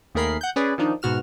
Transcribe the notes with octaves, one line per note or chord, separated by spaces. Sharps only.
D#2 A3 G#4 A#4 B5 C7
F#5 G6
C#4 G#4 B4 D5
D#3 F3 D4 D#4
G#2 B2 F#4 F6 E7